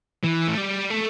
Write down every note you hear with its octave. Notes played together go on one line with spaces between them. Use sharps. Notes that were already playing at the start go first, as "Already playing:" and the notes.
E3
A3
G3
A3